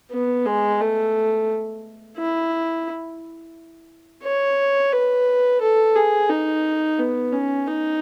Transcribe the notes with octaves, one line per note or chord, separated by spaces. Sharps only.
B3
G#3
A3
E4
C#5
B4
A4
G#4
D#4
B3
C#4
D#4